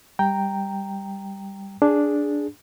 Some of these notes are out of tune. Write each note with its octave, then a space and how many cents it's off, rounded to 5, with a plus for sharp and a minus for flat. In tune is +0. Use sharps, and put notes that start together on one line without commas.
G3 +5 G5 +0 A#5 -5
D4 -5 G#4 +0